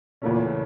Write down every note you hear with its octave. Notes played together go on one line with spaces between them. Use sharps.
E2 A#2 C#3 E3 A3 C#4